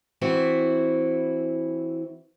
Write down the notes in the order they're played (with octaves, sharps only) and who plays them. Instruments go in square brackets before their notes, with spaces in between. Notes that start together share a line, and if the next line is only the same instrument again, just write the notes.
[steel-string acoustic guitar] E3 C4 E4 F#4